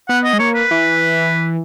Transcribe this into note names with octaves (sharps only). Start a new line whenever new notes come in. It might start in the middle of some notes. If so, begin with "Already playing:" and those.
B3 F#5
D#5
G#3
A#3 C#5
B4
E3